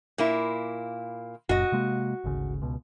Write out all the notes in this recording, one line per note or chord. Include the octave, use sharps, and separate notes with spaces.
A#2 A#3 E4
F#1 F#2 A#2 F#4 D#5
C3 G#3 A#3
G#1 D2 C#3
C#2 B2